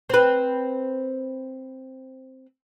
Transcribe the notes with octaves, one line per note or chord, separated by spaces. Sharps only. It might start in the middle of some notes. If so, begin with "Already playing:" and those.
C4 B4